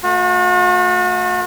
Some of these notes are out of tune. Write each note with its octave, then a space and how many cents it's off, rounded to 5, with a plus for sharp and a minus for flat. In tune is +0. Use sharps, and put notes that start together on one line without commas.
A3 +0 F#4 -40